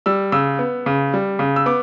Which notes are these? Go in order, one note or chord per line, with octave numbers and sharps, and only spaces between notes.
G3 E6
C#3 E6
B3
C#3
G3
C#3
E6
B3 D6